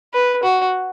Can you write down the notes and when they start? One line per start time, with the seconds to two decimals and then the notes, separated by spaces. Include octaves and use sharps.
0.14 B4
0.43 F#4